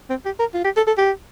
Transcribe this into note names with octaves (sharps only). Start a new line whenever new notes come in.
C4
G4
A#4
F4
G4
A4
A4
G4